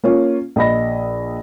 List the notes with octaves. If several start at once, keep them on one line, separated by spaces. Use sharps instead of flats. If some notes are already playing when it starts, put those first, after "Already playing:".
A#3 C#4 F4
A#1 D#5 B5 A#6